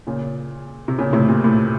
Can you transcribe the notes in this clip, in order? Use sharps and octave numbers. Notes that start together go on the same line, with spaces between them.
A#2 C#3
C3
A#2 C#3
A2 C3
A#2
A2